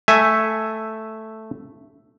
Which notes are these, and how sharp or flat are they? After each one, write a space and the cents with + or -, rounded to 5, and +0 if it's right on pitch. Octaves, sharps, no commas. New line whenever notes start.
A3 +0 E5 +0 G#5 +0